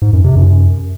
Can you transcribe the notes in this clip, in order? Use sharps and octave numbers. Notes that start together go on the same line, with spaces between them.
G#2
F#2
C3
F#2